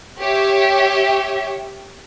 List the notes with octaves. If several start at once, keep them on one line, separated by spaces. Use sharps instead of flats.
G4 C#5 E5